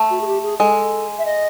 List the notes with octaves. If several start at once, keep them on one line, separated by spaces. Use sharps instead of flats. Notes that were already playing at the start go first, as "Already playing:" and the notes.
Already playing: A3
F#4
G#4
G4
G#4
G#3 A4
E5
D#5